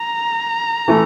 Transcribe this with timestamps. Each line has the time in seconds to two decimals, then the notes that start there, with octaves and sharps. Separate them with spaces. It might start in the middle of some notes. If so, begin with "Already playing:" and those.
Already playing: A#5
0.88 E3 A3